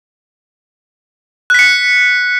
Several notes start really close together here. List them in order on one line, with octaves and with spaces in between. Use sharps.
F#6 B6 C#7